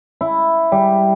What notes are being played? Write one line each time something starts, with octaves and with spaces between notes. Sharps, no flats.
E4
G3